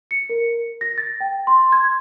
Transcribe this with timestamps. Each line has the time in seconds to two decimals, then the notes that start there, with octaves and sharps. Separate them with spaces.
0.11 C#7
0.29 A#4
0.81 A#6
0.98 A6
1.20 G5
1.47 C6
1.72 G#6